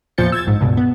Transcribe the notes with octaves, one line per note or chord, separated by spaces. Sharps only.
E2 A#2 F3 G6 A6 C#7
E6 G#6 A6
A#1 G#2
C#2 G2 B2
B3